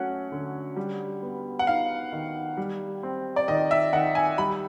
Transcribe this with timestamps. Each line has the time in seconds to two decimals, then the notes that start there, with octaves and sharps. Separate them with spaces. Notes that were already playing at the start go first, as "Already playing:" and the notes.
Already playing: F#3 A3 C#4 F#5
0.32 D3
0.76 G3
1.23 B3
1.59 F#5
1.67 D#4 F5
2.12 D#3
2.57 G3
3.03 C4
3.36 D5
3.48 D#3 D#5
3.71 E5
3.93 D#3 F#5
4.15 G#5
4.38 G3 B5